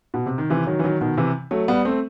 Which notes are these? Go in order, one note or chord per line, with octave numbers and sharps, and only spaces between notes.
B2
C3
D#3
C3 E3
D#3 F#3
E3
D#3 F#3
B2 D#3
C3 E3
F#3 A3
G3 B3
A3 C4